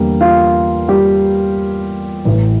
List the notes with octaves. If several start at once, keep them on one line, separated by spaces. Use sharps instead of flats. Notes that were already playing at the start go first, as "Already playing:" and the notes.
Already playing: E2 D3 G3 A#3
F4 F5
G3 G4
A1 A2 E3